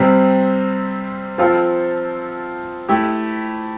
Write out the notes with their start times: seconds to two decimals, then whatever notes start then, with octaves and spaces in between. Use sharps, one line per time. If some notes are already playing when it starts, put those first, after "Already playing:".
Already playing: C3 G3 C4
1.38 F3 C4 F4 A4
2.89 A3 E4 G4